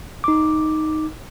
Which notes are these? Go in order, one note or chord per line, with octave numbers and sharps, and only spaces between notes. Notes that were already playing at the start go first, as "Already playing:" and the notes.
D#4 D6